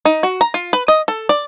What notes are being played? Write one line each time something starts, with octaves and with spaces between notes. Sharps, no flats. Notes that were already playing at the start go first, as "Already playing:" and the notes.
D#4
F#4
A#5
F4
B4
D#5
A4
D5